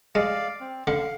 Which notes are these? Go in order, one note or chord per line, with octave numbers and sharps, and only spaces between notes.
G#3 D5 F5
C4
D3 F5